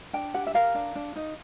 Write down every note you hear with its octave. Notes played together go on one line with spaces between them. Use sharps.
D4 G5
G4 F#5
E5
A#4 F5
D4
D4
D#4